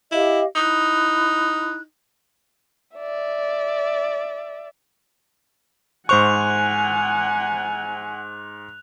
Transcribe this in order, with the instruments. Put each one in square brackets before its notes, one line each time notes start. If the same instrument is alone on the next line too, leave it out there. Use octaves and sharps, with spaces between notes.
[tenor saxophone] E4 [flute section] G4 D#5 F5
[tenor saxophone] D#4 [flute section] E4 F#6
[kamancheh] D5 E5
[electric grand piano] G#2 C5 C#6 [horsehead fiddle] F#5 G#5 [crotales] F#6 F7